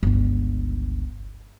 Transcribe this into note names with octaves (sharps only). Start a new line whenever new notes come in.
G1 C#2